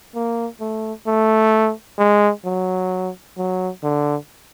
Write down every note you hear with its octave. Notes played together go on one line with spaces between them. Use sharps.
A#3
A3
A3
G#3
F#3
F#3
D3